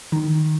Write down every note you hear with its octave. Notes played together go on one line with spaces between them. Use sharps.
D#3